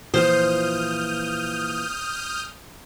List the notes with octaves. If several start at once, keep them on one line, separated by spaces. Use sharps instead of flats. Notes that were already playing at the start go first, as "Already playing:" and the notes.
A#2 E3 F3 C5 D#6 F6 G6